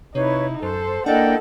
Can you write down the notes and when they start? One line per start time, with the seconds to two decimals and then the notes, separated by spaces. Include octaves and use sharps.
0.15 C3 D#4 E4 B4 C#5
0.63 F#2 A4 C5
1.06 A#3 D4 E4 A4 D5 D#5 F#5 G5